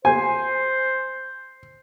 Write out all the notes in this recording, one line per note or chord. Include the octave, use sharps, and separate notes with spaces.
C5 G#5